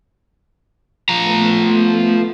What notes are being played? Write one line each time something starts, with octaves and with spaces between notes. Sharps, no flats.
F3 A3 B3 A#5